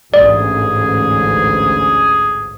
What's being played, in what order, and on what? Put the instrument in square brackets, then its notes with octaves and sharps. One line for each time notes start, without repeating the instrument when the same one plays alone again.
[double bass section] A1 D2 G#2 [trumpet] G#4 [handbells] D5